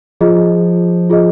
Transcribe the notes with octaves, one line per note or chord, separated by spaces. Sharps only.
F3 F4 G#4 D#5
F4 G#4 D#5